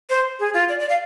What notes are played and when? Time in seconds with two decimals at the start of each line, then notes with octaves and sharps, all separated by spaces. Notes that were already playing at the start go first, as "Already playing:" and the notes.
0.10 C5
0.40 G#4
0.54 F4
0.69 D5
0.79 D5
0.89 F5